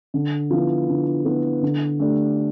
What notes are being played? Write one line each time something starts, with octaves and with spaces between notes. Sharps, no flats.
D3
F3 B3 E4
D3
F3 B3 E4
D3
A3 D4 G4